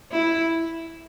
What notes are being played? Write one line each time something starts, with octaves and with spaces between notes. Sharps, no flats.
E4